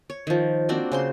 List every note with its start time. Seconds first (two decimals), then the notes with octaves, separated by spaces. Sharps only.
0.10 C#5
0.27 D#3 F3
0.69 A#3 C4 D4 F#4
0.92 C#3 C5 C6